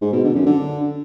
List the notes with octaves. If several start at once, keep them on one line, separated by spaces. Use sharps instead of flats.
G#2
B2
D3
F#2
D3